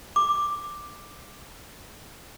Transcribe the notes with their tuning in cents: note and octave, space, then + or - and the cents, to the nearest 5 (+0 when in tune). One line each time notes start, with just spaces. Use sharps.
D6 +5